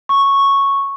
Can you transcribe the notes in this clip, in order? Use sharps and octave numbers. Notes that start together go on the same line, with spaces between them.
C#6